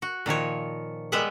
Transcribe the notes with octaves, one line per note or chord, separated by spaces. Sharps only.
F#4
A#2 D#3 F3 C#5
G3 G#3 B3 B4 E5 F#5